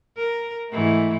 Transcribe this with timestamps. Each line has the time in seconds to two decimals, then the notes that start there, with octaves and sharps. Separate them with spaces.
0.17 A#4
0.70 G#2 E3 A3